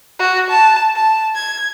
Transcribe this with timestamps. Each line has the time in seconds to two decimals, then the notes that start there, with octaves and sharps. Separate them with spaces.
0.19 F#4
0.50 A5
0.95 A5
1.35 G#6